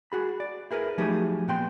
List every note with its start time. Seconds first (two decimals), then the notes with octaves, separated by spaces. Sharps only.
0.12 F#4 G#4 B5
0.40 D5
0.71 E4 G#4 A#4 B4
0.98 F3 F#3 A3 D#4 G4 G#4
1.48 A#2 B3 G5 C6